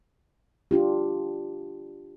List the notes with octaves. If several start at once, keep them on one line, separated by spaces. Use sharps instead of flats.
D4 F4 G4